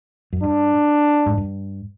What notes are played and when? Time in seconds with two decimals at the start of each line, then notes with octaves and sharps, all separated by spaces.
0.33 F#2
0.43 G2 D4
1.26 G#2
1.38 G2